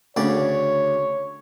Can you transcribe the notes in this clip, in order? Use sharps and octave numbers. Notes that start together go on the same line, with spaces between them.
D2 C#3 C#5 D5